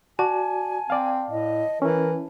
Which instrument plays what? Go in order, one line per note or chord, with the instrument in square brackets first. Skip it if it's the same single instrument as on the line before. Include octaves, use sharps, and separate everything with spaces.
[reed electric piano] F#4 D5 [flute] G#5 [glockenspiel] A5
[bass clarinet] C4 [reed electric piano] D5 F5
[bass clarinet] A2 [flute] D#5
[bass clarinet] E3 [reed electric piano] C#4 E4 [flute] A#4